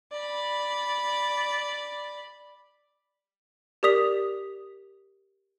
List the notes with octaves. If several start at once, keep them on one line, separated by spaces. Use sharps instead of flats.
D5 B5
G4 A#4 D5 D#6 B6 F7